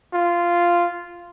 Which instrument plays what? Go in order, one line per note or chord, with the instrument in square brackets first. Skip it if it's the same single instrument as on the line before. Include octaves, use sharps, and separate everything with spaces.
[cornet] F4